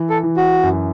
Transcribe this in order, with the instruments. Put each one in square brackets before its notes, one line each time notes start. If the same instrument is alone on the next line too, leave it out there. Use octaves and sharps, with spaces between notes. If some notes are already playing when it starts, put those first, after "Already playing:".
Already playing: [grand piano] E3
[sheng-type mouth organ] A4
[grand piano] E3
[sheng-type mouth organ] F#4
[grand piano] F#2